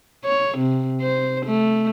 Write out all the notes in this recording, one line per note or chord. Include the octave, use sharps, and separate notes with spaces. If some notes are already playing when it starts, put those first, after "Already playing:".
C#5
C3
C5
A3